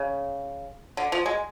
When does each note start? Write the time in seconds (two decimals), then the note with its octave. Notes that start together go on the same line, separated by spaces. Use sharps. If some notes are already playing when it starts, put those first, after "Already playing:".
Already playing: C#3
0.97 D3
1.12 F3
1.26 G#3